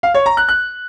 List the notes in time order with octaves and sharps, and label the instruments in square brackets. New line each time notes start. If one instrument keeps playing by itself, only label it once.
[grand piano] F5
C#5
A#5
F#6
F#6